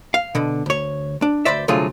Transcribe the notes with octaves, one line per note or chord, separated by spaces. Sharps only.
F5
B2 D3
D2 C#5
D4
D2 D#3 B4 C5 D5 E5
C2 D3 F#3 A3 F4 G#4